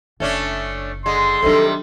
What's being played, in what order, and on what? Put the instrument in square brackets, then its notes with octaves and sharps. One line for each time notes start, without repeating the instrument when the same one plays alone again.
[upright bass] F#1 [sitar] A3 C#4 D4
[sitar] D3 G#3 [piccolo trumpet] C6
[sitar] C3 D#3 G3 [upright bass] F#3 D4 [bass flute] A4